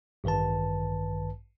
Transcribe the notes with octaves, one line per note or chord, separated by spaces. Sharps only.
A1 G2 D#3 B4 A5